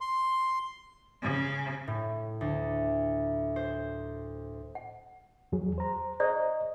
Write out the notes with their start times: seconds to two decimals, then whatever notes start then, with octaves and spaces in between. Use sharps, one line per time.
0.01 C6
1.22 C#3
1.88 A2
2.41 D2
3.56 C5
4.75 F#5
5.52 E2 F#3 G#4
5.78 C5 A#5
6.20 G#4 C5 D5 D#5 A#5